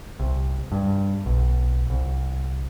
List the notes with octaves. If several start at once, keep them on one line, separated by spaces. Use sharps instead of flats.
C2
G2
B1
C2